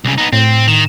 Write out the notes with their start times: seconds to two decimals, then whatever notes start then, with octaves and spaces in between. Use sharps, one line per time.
0.05 C2 C#3
0.18 B3 D#4
0.33 A2 C4
0.68 D#3 E7